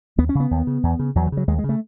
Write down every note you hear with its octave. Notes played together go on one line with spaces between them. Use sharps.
D#2 B3
C#4
C#3 B3
D#2
C#3
E2
C#3
E2 F#3
E3
C#3 F#3
D#2 G#3
G#3
C#3
A3